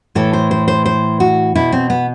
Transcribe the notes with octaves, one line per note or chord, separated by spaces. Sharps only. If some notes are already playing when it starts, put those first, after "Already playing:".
A2 E3 A4
C5
C5
C5
C5
F#4
B2 E4
C4
B3